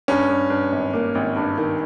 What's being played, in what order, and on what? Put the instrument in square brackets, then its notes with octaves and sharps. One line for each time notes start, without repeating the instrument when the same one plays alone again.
[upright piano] G2 [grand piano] C#4
[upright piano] G2
G2
G#1
A#3
G#1
G2
D#3